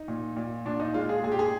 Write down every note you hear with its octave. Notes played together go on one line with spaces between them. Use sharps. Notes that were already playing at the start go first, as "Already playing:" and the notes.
Already playing: D#4
A#2
A#2
A#2 D4
D#4
G#3 F4
G#4
A#2 G#4
G4
G#4